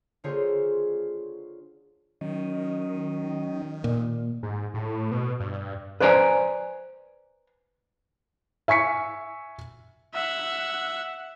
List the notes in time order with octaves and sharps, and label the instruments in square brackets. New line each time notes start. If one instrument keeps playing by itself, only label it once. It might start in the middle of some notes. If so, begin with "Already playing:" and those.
[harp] D3 A#3 F4 G#4 C5 C#5
[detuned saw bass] D#3 [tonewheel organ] F#3 C#4 D#5
[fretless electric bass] A#2
[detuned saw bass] G#2
A2
B2
G2
[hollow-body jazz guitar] B4 C5 D5 G#5 A#5
[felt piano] E5 G#5 C#6 B6 C#7
[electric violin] E5 F#5